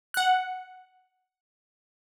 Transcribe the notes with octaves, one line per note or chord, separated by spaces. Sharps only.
F#5 F#6